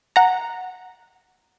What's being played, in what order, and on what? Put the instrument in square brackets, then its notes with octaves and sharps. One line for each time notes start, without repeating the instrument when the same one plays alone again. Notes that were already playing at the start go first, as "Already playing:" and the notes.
[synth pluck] F#5 A#5